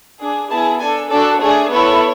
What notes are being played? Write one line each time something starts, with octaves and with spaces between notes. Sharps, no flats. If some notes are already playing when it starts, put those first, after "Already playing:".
D4 G#4
B3 E4 G#4 A5
D4 A4 G#5
D4 F#4 A4 D5
A3 D4 G#4 C#5
B3 E4 A4 C#5